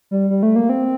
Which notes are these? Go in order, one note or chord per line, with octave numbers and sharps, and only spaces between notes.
G3
G3
A3
A#3
C4